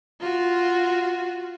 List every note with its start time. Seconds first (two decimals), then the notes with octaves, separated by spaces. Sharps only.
0.20 F4 F#4